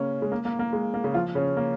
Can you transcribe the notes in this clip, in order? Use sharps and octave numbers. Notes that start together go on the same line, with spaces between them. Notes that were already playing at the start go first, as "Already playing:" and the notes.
Already playing: C#3 A#3 C#4
G#3
A#3
A#3
A#3
G#3
A#3
C#3 C#4
F3 F4
C#3 C#4
A#3